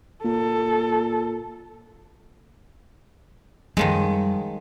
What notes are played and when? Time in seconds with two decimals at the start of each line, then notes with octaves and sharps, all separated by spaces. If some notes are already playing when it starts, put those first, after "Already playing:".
0.24 A#2 A4
3.77 F#2 D#3 F3 G3 G#3